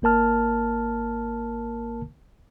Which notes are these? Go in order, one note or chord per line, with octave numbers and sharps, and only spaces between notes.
G#1 A#3 A#4 A5 F6